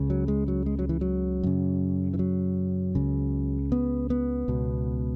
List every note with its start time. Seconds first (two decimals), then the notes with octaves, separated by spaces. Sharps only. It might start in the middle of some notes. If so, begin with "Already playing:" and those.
Already playing: C#2 C#3
0.10 F#3
0.28 G#3
0.48 F#3
0.66 G#3
0.79 F#3
0.89 E3
1.01 F#3
1.43 F#2 C#3
2.14 E3
2.19 F#3
2.95 C#2 C#3
3.72 B3
4.10 B3
4.48 C#2 B2